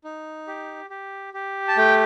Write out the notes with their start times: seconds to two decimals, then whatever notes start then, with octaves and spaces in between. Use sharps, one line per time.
0.04 D#4
0.47 G4
0.90 G4
1.34 G4
1.68 A5
1.77 A3 G5